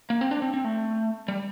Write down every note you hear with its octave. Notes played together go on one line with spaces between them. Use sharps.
A#3
C4
D4
C4
C4
A3
G3